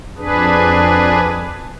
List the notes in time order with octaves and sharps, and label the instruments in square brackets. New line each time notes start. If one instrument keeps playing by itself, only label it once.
[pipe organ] F2 D4 G#4 B4